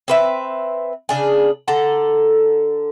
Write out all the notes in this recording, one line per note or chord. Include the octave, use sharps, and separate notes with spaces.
C4 B4 E5
C#3 D4 G#4
D3 A4 F#5 A#5